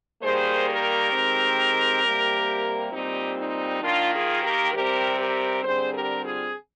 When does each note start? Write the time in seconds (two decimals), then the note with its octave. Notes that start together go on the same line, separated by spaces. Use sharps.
0.22 D#3 G3 A#3 G#4 C5
0.67 G4 A#4
1.13 D#3 G#3 C4
2.02 C3 G3 A#3
2.92 A#2 G3 C4 D#4 G4
3.38 D#4
3.82 D#3 A#3 D4 F4
4.13 F4 G#4
4.42 G4 A#4
4.73 C3 G3 C4 G4 A#4
5.18 G4 A#4
5.63 D3 G3 C4 G#4 C5
5.93 G4 A#4
6.24 F4 G#4